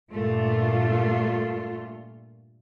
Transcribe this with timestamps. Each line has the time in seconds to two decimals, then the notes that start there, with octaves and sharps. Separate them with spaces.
0.10 G2 A#2 A3 F4